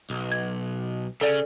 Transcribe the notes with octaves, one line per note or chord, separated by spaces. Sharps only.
B1
G#6
C#3 C#4 A4 D5